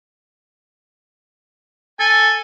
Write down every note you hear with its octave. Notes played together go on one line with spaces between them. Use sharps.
A4 G#5